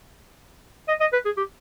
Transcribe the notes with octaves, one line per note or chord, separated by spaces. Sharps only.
D#5
D#5
B4
G#4
G4